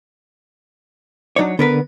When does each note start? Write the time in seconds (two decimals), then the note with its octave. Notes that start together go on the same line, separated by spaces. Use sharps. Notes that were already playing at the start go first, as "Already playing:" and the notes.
1.36 F#3 D4 D#4 C#5 D5
1.59 D3 B3 A#4 B4